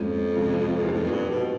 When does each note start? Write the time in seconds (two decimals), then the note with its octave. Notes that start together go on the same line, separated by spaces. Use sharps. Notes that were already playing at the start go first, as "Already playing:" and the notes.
Already playing: F2 G#2 F3 A#3 C#4 F4
0.36 C3 F3 G#3 C#4
0.83 E2
0.92 F2 A2 F#3 B3 D#4 G4
1.11 G2
1.30 B2